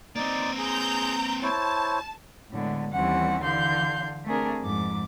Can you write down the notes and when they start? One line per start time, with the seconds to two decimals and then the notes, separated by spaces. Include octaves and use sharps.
0.16 A#3 C4 D#4 D5
0.58 G#4 A#5 G6
1.43 E4 C5 C#5 A5
2.51 A2 D3 G#3 B3
2.92 D#2 E3 G3 C4 C#4 F#5
3.42 D3 E3 F5 C6 G6
4.25 A3 C4 D4 G#4 A#4
4.61 F2 G#2 D6